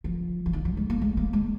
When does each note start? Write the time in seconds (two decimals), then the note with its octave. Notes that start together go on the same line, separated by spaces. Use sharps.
0.04 F3
0.46 F3
0.53 D#3
0.65 F#3
0.77 G#3
0.90 A#3
1.02 G#3
1.17 A#3
1.33 G#3